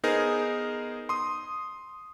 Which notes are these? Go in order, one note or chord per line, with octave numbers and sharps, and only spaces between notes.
B3 D#4 G#4 A#4 C5
C6 D#6